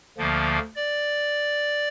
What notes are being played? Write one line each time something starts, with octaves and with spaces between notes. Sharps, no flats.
D2 D3 F3 A#3
D5